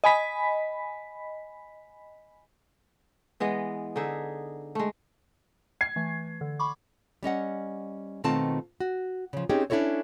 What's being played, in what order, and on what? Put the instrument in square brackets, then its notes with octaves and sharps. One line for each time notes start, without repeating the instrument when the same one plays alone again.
[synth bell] D#5 G#5 B5 B6
[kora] E3 G#3 B3 D#5
D3 D#4 G#4 E5
G#3 A3
[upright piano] G#6 C7
[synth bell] E3 A3
D3
B5 C#6 D6
[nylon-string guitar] G3 C#4 D#5 F#5
B2 D#3 A3 C4 F4 A5
F#4
C#3 F3
C4 C#4 D#4 G4 G#4
C#4 D4 E4 F#4 A4 C#5